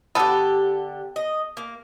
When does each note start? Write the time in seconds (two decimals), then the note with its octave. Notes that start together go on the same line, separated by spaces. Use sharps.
0.15 D3 B3 G4 A4
1.16 D#5
1.57 A#3